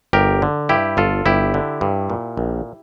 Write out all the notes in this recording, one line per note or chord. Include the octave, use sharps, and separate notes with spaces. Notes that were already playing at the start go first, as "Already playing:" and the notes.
G1 G4 A#4
D3
G2 E4 G4
G1 F4 A4
G1 E4 G4
D3
G2
A#2
A#1